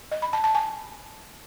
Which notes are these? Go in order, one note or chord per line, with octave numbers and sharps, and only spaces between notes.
D#5
B5
A5
A5
G#5